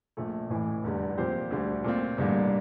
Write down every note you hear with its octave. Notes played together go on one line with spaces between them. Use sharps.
A#1 A#2 A3
A1 A2 E3
F1 E2 D3 G3
A#2 F3 C4 G4 C5
D2 D3 G3
A#2 A3 C4 F4
A1 G2 D3 G3 A#3